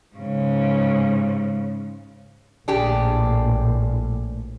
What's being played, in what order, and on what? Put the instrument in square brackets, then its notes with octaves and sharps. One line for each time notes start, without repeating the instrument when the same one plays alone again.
[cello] G#2 C#3
[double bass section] A#1 A2 [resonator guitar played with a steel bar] D4 G4 G#4